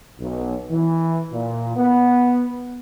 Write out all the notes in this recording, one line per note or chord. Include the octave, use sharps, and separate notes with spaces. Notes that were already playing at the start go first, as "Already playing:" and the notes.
B1
E3
A#2
B3